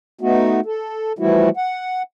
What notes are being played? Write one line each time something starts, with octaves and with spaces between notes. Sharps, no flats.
A3 B3 D#4 F#4
A4
E3 F3 G3 A3 E4 F#4
F#5